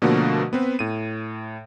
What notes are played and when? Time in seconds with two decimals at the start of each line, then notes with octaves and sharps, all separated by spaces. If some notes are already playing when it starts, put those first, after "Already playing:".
0.02 B2 D3 F3 A3 A#3 F#4
0.53 B3 C4 B4
0.79 A2 D#7